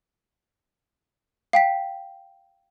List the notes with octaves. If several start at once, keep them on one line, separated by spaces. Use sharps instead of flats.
F5 G5 B6